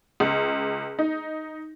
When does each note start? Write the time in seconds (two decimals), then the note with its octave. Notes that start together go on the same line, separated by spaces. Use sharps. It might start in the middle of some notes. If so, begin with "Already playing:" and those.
0.20 C#2
0.99 D#4